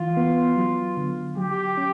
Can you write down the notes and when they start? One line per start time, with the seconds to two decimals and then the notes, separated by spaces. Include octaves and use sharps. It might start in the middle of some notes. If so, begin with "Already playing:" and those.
Already playing: E3 F4
0.17 B3
0.57 F#3
0.97 D3
1.37 F#3 G4
1.77 C#4